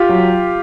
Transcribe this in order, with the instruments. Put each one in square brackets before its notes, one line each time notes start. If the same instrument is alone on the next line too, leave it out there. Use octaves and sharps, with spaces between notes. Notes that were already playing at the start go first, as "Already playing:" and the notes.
Already playing: [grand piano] F4 G4
F#3